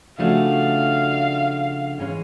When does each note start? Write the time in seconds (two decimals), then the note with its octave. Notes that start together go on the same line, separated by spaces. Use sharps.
0.18 C#3 F3 A3 D4 F#4 F5
1.98 G#2 E3 G#3 C#4